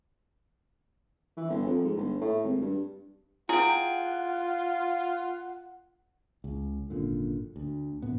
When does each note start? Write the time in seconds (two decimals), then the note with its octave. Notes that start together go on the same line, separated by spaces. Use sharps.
1.37 E3
1.50 G1
1.67 F2
1.84 G#2
1.97 G1
2.21 A2
2.44 G#1
2.62 G2
3.49 E4 F4 G#4 F#5 G5
6.44 C#2
6.90 G#1 F#2 A#2 D3
7.56 D2
8.02 A1 D2 A2 B3